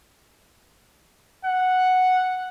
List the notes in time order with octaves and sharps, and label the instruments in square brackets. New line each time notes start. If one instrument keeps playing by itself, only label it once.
[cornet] F#5